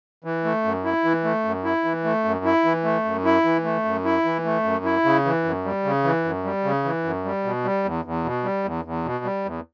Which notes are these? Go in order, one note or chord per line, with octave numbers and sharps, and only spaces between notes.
E3
A3
F#2
E4
E3
A3
F#2
E4
E3
A3
F#2
E4
E3
A3
F#2
E4
E3
A3
F#2
E4
E3
A3
F#2
E4
C#3
E3
F#2
G3
C#3
E3
F#2
G3
C#3
E3
F#2
G3
B2
G3
E2
E2
B2
G3
E2
E2
B2
G3
E2